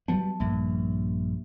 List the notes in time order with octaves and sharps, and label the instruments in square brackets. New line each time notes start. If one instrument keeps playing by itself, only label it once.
[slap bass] F#3 G3 B3 [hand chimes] A5
[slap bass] A#1 G2 [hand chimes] A#3